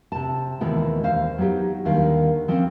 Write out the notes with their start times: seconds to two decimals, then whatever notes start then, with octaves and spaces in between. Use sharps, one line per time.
0.12 C3 A5
0.61 D#2 B2 D#3 E3 G#3 B3
1.03 D#2 C5 F5
1.38 F#3 B3 D#4 G4
1.85 D#2 D3 D#3 G3 F5
2.48 F3 C4 C#4